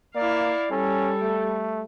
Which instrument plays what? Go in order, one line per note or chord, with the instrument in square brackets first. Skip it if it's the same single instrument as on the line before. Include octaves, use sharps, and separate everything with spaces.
[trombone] A#3 [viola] E4 F5 [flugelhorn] D5
[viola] G3 [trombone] C#4 [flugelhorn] A4
[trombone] A3